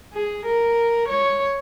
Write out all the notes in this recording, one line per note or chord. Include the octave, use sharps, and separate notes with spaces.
G#4
A#4
C#5